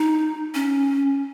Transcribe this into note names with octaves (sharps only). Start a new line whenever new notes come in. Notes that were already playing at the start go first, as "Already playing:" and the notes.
Already playing: D#4
C#4